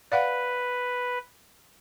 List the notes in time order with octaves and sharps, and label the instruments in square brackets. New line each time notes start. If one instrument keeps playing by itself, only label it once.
[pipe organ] B4 [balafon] D5 F5 F#5